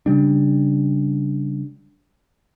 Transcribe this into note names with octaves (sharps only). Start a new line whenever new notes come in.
C#3 G3 D4